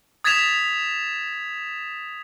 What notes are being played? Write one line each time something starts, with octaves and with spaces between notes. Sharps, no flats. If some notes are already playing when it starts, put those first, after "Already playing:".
D#6 G#6 A6 B6 E7 F7